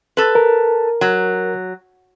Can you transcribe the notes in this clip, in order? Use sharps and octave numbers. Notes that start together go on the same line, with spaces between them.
A4 B4
A#4
F#3